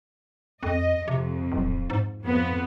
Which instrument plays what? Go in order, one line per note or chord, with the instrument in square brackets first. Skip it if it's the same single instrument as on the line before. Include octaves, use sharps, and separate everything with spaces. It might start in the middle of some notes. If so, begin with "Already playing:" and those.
[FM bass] F2 [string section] D#5
[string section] F2 [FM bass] C3
[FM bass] D1
G#2
[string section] F2 B3